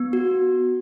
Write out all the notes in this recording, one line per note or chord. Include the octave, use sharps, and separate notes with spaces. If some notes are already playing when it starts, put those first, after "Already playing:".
Already playing: B3
F#4